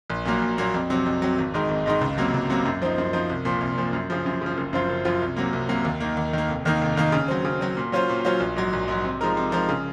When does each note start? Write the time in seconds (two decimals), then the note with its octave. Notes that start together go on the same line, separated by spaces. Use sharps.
0.10 A#1
0.25 A#2 F#3 A#3
0.42 A#1
0.58 A#2 F#3 A#3
0.74 F2
0.90 C3 F#3
1.06 F2
1.22 C3 F#3
1.38 G#1
1.54 G#2 D#3 G#3 D#4
1.69 G#1
1.86 G#2 D#3 G#3 D#4
2.01 C#2
2.18 C3 F#3 A#3
2.34 C#2
2.50 C3 F#3 A#3
2.65 F#2
2.82 F3 C4 D#4
2.98 F#2
3.13 F3 C4 D#4
3.29 C2
3.45 A#2 F3
3.61 C2
3.78 A#2 F3
3.93 F#2
4.10 C#3 F3
4.26 F#2
4.41 C#3 F3
4.57 F#1
4.73 F#2 F3 C4 F4
4.89 F#1
5.05 F#2 F3 C4 F4
5.22 C2
5.36 C3 F#3 A#3
5.53 C2
5.69 C3 F#3 A#3
5.85 D#2
6.00 D#3 A#3
6.17 D#2
6.33 D#3 A#3
6.48 F1
6.65 D#2 D#3 A#3 D#4
6.81 F1
6.97 D#2 D#3 A#3 D#4
7.12 C#3
7.28 F#3 C4
7.45 C#3
7.61 F#3 C4
7.77 A#2
7.92 F#3 C#4 F4 C5
8.09 A#2
8.25 F#3 C#4 F4 C5
8.40 A#1
8.56 G#2 F#3
8.73 A#1
8.88 G#2 F#3
9.05 C3
9.21 F3 G#3 D#4 A#4
9.37 C3
9.52 F3 G#3 D#4 A#4
9.69 C#3